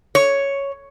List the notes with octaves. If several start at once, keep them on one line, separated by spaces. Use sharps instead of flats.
C#5